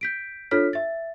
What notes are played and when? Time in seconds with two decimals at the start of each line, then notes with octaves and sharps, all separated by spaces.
0.01 G6 B6 D7
0.51 D4 F4 A4 C#5 F6 B6
0.73 E5 A6